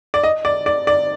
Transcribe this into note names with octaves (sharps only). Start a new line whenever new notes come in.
D5
D#5
D5
D5
D5